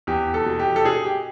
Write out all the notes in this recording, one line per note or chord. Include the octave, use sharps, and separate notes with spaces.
E2 G4
A4
B2
G4
A4
B2 G#4
G4